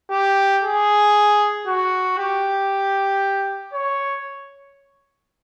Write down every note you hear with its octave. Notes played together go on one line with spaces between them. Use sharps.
G4
G#4
F#4
G4
C#5